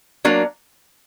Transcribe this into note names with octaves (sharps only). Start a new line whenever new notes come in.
F#3 A#3 D4